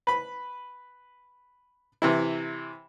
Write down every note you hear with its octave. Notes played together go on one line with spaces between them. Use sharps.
B4 B5
C3 E3 E4